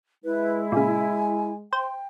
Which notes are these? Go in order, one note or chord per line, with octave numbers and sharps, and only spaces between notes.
G#3 E4 B4
A#2 C#3 G#5
C5 G5